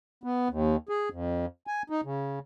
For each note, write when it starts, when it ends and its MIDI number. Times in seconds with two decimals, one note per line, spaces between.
0.24 0.48 59
0.49 0.76 39
0.89 1.09 68
1.11 1.46 41
1.67 1.82 80
1.90 2.01 63
2.04 2.39 49